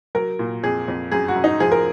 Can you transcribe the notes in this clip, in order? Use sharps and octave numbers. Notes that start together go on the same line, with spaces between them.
F#3 A#4
A#2
F2 G#4
F2
F#2 G#4
F#4
F#2
D#4
F3 G#4
A#4